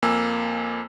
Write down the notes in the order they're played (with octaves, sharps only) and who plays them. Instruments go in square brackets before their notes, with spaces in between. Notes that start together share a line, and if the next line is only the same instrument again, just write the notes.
[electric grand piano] F2 A#3 G#5 E6